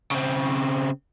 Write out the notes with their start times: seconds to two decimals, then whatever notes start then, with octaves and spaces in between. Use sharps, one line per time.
0.11 C#3 C4